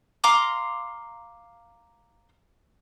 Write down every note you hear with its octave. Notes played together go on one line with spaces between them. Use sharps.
F5 A#5 C6 D6